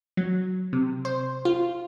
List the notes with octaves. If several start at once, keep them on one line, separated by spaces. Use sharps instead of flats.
F#3
C3
C5
F4